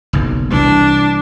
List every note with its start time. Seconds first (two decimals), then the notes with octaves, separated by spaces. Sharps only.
0.13 F#1 B1 F#2
0.52 C2 E3 D4